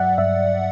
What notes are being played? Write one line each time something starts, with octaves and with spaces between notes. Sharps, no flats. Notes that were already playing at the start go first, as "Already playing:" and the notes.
Already playing: G2 F#3 D5 E5 F#5
G2 E5